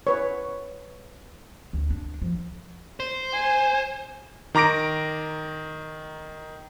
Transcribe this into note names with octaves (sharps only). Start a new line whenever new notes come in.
B4 C#5
D2
D4
F3
C5
G#5
D#3 A#5 D6 A#6 D7